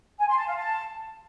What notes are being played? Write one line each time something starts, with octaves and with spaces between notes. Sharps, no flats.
G#5
C6
A5
F5
A5